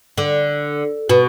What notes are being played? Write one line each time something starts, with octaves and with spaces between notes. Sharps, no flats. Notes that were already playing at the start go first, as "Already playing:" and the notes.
D3
B2